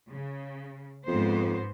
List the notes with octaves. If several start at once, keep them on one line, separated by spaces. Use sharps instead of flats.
C#3
F2 G#2 B3 C5